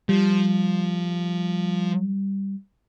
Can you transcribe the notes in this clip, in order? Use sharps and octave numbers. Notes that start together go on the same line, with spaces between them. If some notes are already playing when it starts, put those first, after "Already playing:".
F3 G3